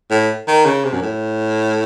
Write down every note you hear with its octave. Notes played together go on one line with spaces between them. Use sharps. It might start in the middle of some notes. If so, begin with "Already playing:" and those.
A2
D#3
C#3
C3
F#2
A2